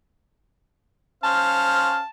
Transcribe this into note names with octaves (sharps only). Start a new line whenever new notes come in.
C#4 C5 F5 A5